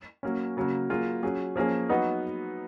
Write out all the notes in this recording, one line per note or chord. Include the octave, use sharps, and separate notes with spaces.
F#3 A#3 C#4
C#3 F#3 A#3
F#3 A#3 F4 G#4
F#3 C#4 G#4
F3 A#3 C#4 G#4
F#3 B3 D#4 F#4